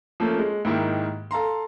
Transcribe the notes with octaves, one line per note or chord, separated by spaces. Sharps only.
F3 A3 A#3 C#4
G#3
G#2 D#3 A#3 E4 G4
A4 F5 A#5 C6